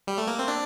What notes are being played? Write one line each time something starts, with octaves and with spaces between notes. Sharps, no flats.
G3
A3
A#3
C4
D4